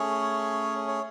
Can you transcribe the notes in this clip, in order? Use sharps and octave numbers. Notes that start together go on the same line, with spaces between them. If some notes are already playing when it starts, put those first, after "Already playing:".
Already playing: A3 C#4 G#4 C#5
C#5